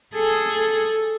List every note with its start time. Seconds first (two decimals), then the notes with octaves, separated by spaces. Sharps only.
0.15 G#4 A4